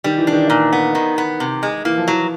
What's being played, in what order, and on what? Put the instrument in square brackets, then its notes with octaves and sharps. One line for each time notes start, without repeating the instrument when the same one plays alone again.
[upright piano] D#3 [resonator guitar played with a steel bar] G3
[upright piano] E3
[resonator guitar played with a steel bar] D4
[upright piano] D#3
[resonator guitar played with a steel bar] A#2
B3
D#3
B3
C3
G#3
[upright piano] E3 [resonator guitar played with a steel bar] A#3
[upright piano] F3
[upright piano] E3 [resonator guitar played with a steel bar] F#3